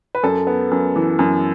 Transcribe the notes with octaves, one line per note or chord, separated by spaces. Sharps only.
B4
F#2 A4
B3
F#2
E3
F#2